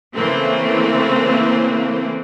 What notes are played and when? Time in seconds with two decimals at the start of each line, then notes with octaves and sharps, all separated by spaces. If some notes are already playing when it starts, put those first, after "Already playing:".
0.16 C#3 E3 A3 A#3 C4